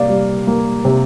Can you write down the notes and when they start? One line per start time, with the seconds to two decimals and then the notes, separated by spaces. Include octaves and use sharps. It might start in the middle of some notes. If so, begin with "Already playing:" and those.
Already playing: C3 A#3 D5 F5
0.09 G3
0.47 A#3
0.85 C3